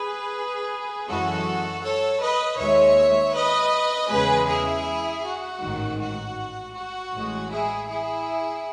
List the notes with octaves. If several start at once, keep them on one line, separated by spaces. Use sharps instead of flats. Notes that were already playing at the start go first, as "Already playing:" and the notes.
Already playing: G#4 B4
F#2 E3 G#3 F#4 A4
A4 C#5
B4 D#5
D#2 D#3 G#3 C#5 E5
B4 D#5
E2 C#3 G#3 G#4 B4
E4 G#4
F#4
A1 G#2 D#3
F#4
F#4
A1 A2 E3 G#3
E4 G#4
E4 G#4